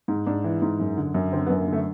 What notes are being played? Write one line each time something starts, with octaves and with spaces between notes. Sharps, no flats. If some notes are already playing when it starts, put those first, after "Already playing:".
G#2
G#2 D4
E3
G#2
F#2
D3
F#2
D3 C4
B3
F#2
A#3
D3 A3